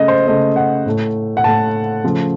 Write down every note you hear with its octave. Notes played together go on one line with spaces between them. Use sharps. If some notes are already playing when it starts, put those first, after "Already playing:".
Already playing: C#3 A3 D#5
C5
C#3 A3 D#5
F#5
A2 A3
F#5
A2 A3 A5
C#3 F3 A3